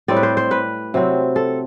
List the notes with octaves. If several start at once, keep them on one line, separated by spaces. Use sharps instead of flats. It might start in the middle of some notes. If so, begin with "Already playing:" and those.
A2 G3 C4 D5
B4
C5
C5
B4
C3 F#3 C4
A4